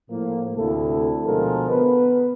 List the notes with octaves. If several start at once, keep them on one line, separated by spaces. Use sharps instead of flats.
A2 F3 A#3
D2 C3 E4 A4
B2 D3 F3 G#3 A4 A#4
B3 B4